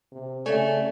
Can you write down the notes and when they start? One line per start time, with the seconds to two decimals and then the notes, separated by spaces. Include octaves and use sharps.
0.12 C3
0.46 C#3 A3 A4 C#5 D5 E5 G#5